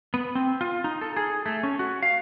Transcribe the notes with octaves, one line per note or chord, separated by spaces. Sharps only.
B3
C4
F4
D#4
A4
G#4
A3
C#4
F#4
F5